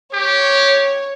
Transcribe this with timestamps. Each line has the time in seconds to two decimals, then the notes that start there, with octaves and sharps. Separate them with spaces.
0.14 G4 C#5